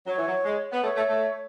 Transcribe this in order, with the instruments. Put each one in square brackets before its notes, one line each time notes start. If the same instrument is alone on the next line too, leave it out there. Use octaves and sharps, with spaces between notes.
[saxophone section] F#3 [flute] C#5
[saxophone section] E3
F#3
G#3
B3
[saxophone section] A3 [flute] C#5
[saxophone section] A3
A3